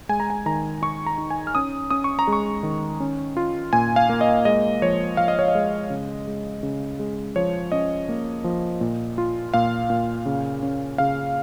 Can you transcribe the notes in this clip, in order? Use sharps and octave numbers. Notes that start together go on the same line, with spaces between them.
G#3 G#5
A#5
G#5
D#3 A#5
D#4 C#6
A#5
D#4
G#5
F6
C#4 D#6
C#4 D#6
C#6
A#5
G#3
C#6
D#3
C#4
F4
A#2 G#5
F5
A#3
D#5
G#3 D#5
F3 C#5
F3 F5
D#5
C#5
D#5
G#3
C#3
G#3
C#3
G#3
F3 C#5
C#4 D#5
A#3
F3
A#2
F4
A#2 F5
A#2
C#3
C#4
C#3 F5